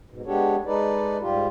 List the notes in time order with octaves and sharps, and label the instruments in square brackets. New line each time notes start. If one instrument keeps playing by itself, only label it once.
[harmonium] G#2 B2
G#3 B3 D4 G4 A4 C#5
G#3 D#4 A4 B4 D5
G#2 G3 F4 G4